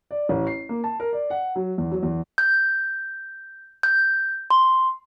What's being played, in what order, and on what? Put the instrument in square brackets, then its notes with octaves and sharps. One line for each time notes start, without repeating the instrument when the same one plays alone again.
[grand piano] D5
A1
C7
A#3
A5
A#4
D5
F#5
F#3
E2
F#3
E2
[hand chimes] G6
G6
C6